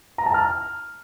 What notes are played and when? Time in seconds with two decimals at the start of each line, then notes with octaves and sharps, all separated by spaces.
0.18 A#5
0.26 A5
0.34 F6